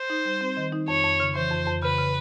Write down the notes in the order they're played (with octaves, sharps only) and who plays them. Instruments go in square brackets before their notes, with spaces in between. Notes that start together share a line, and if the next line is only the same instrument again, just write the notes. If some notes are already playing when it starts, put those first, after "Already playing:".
Already playing: [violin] C5
[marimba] D#4
G3
C4
D#3
D#4
[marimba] F2 [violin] C#5
[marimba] F2
C#3
[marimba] E3 [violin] C5
[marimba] F2
F2
[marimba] C#3 [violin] B4
[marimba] C#3